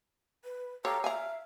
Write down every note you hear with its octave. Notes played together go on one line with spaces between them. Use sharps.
B4
G4 A4 C#5 F5 A#5
E5 F5 G#5 A#5